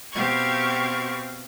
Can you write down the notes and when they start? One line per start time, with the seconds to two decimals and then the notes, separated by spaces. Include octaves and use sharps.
0.12 B2 C4 G4 F5 C#6 G#6